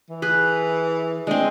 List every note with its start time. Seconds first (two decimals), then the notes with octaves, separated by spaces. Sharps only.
0.09 E3
0.22 G#4 B4
1.27 G#3 C4 D4